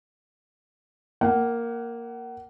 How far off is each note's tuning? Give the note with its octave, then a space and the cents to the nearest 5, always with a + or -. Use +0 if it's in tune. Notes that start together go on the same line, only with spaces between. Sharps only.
A#3 +0 F#5 +30